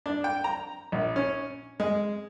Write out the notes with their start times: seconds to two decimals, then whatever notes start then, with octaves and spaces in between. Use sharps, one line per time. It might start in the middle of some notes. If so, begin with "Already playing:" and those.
0.06 D4
0.24 G5
0.44 A#5
0.92 A#1
1.16 C#4
1.80 G#3